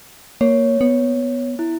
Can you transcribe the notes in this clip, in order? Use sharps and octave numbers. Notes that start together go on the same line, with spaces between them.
A#3 C#5
B3
E4